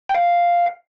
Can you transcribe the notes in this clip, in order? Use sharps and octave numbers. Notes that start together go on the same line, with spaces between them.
G5
F5